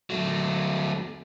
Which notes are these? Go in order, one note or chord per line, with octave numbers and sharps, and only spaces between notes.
F#3 A3